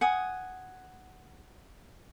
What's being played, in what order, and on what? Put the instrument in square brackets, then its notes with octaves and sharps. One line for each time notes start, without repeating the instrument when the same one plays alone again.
[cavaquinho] F#5 G#5 D#6